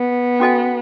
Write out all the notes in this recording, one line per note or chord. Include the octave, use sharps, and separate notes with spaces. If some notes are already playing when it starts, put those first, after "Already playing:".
Already playing: B3
C#4 F#4 A4 D#5 G#5